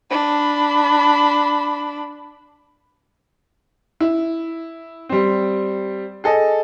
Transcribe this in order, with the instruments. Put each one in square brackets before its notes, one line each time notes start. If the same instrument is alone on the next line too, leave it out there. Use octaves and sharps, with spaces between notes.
[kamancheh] D4 B5
[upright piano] E4
G3 C4
G#4 A4 D#5